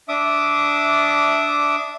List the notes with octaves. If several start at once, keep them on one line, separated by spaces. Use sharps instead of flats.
D4 E5 D6 D#6